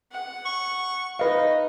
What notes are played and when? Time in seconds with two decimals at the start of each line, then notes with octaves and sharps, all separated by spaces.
0.12 F#5
0.45 C#6
1.19 D#4 B4 D#5 F5